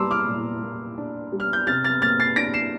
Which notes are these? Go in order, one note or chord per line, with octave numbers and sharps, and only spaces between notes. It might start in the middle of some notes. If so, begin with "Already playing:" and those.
Already playing: G3 A#3 A5 A#5 C6 D6 E6
D6 F6
A#2
A#3
D4
G3
F6
G6
C3 F6 A6
F6 A6
A#3 F6 A6
A6 C7
D4 A#6 D7
C7 E7